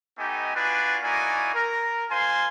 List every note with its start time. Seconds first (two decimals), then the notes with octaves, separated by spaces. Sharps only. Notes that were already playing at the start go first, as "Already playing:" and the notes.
0.18 A3 B3 D#4 G4 D#5 G#5
0.55 D4 F4 F#4 B4 D5 G#5
1.03 A#3 D#4 E4 F#4 D5 G#5
1.55 A#4
2.11 F4 C5 F5 G#5 C6